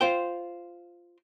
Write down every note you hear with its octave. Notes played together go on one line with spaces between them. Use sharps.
F4 C5 G5